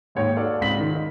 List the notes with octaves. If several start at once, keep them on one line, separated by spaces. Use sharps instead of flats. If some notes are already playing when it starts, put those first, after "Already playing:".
D#2 G#2 C#5 G5
F#4 A4 D5 F5
C#2 G#2 C4 B6 F#7
D#3
D#5